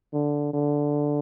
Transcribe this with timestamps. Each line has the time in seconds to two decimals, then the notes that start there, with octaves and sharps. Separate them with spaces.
0.13 D3
0.54 D3